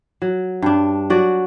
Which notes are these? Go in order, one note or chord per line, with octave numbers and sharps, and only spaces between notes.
F#3
G2 D4
F#3 F#4 D5